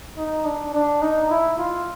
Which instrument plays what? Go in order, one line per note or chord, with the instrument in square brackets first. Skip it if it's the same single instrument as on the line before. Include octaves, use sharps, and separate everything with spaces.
[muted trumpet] D#4
D4
D4
D#4
E4
F4